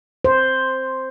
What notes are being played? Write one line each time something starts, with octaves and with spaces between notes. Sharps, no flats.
C5